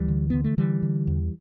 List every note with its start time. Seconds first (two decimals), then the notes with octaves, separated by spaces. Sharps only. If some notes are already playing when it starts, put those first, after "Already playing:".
Already playing: D2 E3 G3
0.08 D3
0.30 D3 B3
0.44 A3
0.58 D3 E3 G3
0.82 D3
1.07 E2